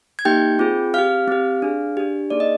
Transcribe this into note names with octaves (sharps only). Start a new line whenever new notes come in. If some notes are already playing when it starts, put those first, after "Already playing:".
G#6
A#3 D#4 G4 G5 G6
C4 F4 G#4
C4 G4 F5 F6
C4 G4
D4 G#4
D4 G4
A#3 D#4 G#4 D5
D#5